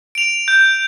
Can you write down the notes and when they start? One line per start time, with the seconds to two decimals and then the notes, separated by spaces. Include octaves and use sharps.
0.15 D7 F7
0.48 G6